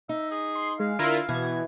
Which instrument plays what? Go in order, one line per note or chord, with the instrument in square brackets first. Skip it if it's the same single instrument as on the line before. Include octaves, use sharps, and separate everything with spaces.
[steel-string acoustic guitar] D#4 [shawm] E5
[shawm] G#4
[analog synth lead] C6
[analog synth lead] G#3 [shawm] F5
[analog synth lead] D3 [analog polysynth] E4 F4 A#4
[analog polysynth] B2 [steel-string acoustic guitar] E3 [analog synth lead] G#6